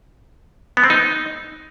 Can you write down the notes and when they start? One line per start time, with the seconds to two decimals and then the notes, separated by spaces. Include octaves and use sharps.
0.77 B3
0.84 C4
0.90 D#4